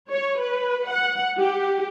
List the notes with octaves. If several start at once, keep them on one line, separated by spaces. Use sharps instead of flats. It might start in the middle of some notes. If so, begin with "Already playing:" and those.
C#5
B4
F#5
G4